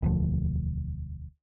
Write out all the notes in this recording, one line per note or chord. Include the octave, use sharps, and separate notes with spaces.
E1 D2 F3